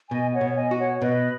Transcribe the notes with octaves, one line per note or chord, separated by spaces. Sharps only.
B2 D#5 G#5
C#5 F#5
B2
F#5
D#5 G#5
F#4
C#5 F#5
B2 B4 D#5